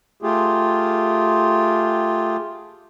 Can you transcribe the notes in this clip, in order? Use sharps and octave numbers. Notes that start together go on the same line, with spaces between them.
A3 F4 G4 G#4